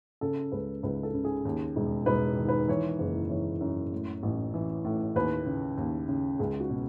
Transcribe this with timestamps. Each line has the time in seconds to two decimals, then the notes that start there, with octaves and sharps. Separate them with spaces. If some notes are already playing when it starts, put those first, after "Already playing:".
0.21 C#3 A4
0.52 C#2 B4
0.83 C#2 B4
1.03 A4
1.14 C#3
1.25 G#4
1.45 D#2
1.76 E1
2.06 E1 B4
2.38 D#3
2.48 B4
2.68 E3 C#5
2.99 F#1 B4
3.30 E3 C#5
3.61 F#2
3.93 A2
4.23 A1
4.54 E3
4.85 A2
5.16 D#2 B4
5.46 C#3
5.77 D#2
6.08 C#3
6.39 C#2 G#4
6.60 F#4
6.70 B2